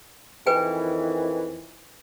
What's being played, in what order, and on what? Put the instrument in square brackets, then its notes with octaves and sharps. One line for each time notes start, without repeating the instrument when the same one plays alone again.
[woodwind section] F2 D#3 E3 [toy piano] B4 G5 G#5